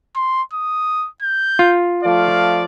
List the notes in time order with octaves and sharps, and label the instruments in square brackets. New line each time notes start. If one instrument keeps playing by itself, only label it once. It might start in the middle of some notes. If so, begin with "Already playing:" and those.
[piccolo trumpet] C6
D#6
G6
[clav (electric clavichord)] F4
[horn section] F3 A3 D5 [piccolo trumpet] F5